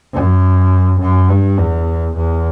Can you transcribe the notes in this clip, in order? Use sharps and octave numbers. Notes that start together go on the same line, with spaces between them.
F#2
F#2
G2
E2
E2